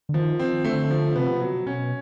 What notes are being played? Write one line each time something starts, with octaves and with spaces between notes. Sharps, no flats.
D3
D#3 F3
C4
D3 A3
F3
C3 B3
B2 F#3
B2 C#4